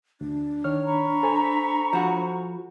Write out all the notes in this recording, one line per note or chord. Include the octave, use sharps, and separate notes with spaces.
D2 D4
D#3 C#5 F6
A#5 B5 C#6
A4 C5 G#5
F3 F#4